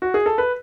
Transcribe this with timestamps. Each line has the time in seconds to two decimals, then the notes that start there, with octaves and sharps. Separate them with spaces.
0.02 F#4
0.14 G#4
0.26 A4
0.38 B4